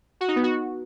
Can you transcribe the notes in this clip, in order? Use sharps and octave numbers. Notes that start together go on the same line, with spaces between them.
F#4
D#4
B3
F#4